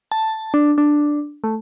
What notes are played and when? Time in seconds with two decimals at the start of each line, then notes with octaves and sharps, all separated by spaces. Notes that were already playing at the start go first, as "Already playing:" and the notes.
0.12 A5
0.54 D4
0.78 D4
1.44 A3